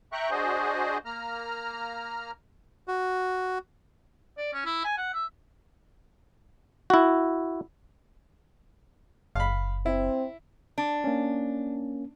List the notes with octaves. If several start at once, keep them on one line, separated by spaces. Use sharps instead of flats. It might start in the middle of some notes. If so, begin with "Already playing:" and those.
E5 G5 A#5 C#6 F#6
D4 F#4 G#4 C5 D#5
A#3 A#5 F6
F#4
D5
C#4
E4
G#5
F#5
E5
E4 F#4
F#1 F5 B5
C4 E4
D4
A#3 C#4